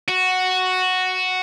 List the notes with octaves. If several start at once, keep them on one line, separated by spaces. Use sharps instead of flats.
F#4